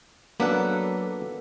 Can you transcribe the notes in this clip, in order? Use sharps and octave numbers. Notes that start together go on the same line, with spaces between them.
F#3 A#3 B3 D4 A4 F#5